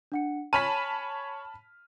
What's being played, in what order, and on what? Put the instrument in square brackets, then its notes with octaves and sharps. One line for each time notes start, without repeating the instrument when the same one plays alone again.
[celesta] D4 F#5 C#7
[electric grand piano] C#5 F6 D#7 [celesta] G#5 [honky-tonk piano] A5 B5 B6